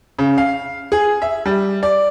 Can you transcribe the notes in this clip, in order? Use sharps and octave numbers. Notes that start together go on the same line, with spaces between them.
C#3
F5
G#4
E5
G3
D5